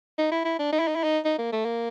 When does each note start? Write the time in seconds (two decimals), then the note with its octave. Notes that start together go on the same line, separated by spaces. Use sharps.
0.18 D#4
0.32 E4
0.45 E4
0.59 D4
0.73 D#4
0.80 E4
0.88 D#4
0.95 E4
1.03 D#4
1.25 D#4
1.38 A#3
1.52 A3
1.65 A#3